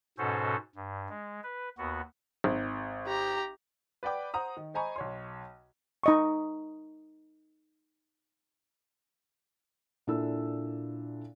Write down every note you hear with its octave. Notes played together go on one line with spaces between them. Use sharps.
G#2 B2 C#4 F#4 A4 C5
G2
G#3
B4
D#2 B3 F#4
G#1
G4 A#5
B4 D5 F#5 G5 D6
C5 F#5 A#5 D#6
D#3
C5 D#5 G#5 A#5 B5 C#6
B1 C#5 C6
D#4 D#5 C#6
A#2 D4 E4 A4 E6